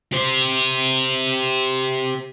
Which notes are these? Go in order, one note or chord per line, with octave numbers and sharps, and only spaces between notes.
G4 C5